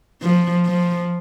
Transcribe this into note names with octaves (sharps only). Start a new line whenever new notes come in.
F3
F3